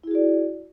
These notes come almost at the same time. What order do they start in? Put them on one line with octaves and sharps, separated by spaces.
E4 G#4 F#4 D5